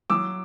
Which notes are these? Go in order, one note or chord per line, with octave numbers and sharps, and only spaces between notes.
F#3 D6 E6